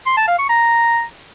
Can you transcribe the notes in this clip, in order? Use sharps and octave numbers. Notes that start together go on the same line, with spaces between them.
C6
A5
F5
C#6
A#5